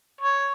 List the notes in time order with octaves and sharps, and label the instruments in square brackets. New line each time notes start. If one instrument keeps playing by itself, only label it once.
[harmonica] C#5